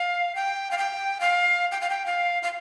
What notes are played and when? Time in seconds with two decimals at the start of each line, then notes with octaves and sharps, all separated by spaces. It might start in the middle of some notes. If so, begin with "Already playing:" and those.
Already playing: F5
0.35 G5
0.71 F5
0.78 G5
1.21 F5
1.72 G5
1.81 F5
1.90 G5
2.06 F5
2.43 F5